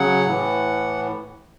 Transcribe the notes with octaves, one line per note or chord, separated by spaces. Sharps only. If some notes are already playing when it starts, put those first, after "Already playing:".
Already playing: C#3 F#3 F#5
A2 E3